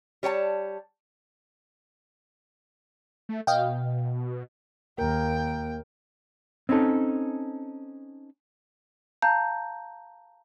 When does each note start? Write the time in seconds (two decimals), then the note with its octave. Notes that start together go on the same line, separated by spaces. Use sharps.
0.23 G3 C#5 G5 A5
3.29 A3
3.47 B2 D#5 F5 G5
4.98 D#2 A#3 A#4 G5
6.69 C4 C#4 D#4 A4
9.22 F5 A5 A#5 G6